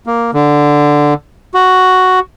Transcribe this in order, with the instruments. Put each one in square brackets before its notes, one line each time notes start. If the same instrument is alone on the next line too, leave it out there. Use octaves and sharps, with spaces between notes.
[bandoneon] A#3
D3
F#4